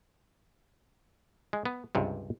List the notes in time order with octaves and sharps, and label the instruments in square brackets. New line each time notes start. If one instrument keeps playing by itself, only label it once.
[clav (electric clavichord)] G#3
B3
C#2 G2 C3